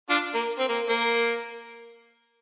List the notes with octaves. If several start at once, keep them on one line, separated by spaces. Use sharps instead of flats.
D4 F4
A#3
C4
A#3
A#3